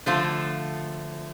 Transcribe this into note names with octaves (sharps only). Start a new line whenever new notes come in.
D3 F3 A3 F4